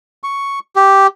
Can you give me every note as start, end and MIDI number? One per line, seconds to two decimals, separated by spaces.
0.23 0.59 85
0.76 1.07 67